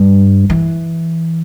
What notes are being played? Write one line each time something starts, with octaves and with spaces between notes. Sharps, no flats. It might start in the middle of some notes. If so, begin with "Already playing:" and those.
Already playing: G2
E3